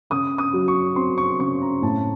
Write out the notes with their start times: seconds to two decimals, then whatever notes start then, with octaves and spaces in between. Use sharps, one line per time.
0.10 C#3 D#6
0.38 D#6
0.53 F#3
0.68 C#6
0.96 C4 C6
1.18 C#6
1.39 C#3 C#6
1.61 A#5
1.82 A2 A5